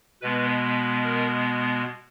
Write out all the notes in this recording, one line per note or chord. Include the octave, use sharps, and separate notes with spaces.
B2 G#3 B3 B4
A#4